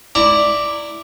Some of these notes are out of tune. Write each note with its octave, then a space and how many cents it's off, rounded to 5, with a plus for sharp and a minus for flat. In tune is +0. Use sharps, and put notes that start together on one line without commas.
E4 +0 D5 +0 A#5 -30